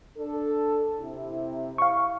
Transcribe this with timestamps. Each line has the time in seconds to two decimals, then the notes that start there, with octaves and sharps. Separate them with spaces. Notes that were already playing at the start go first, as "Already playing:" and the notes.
0.18 D4 A4
1.00 C3 E4
1.78 F5 C#6